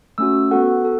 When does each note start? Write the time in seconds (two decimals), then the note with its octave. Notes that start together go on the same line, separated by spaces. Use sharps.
0.18 A3 C#4 F#4 E6
0.51 B3 F#4 A4 F#5
0.85 A4